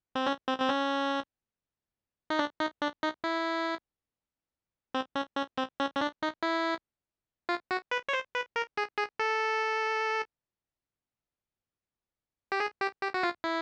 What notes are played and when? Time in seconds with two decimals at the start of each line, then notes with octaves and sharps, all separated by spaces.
0.15 C4
0.27 C#4
0.48 C4
0.60 C4
0.69 C#4
2.30 D#4
2.39 D4
2.60 D#4
2.82 D4
3.03 D#4
3.24 E4
4.94 C4
5.15 C#4
5.36 C#4
5.58 C4
5.80 C#4
5.95 C#4
6.01 D4
6.23 D#4
6.43 E4
7.49 F4
7.71 F#4
7.91 B4
8.09 C#5
8.13 C5
8.35 B4
8.56 A#4
8.77 G#4
8.98 G#4
9.19 A4
12.52 G4
12.60 G#4
12.81 G4
13.02 G4
13.14 F#4
13.23 F4
13.44 E4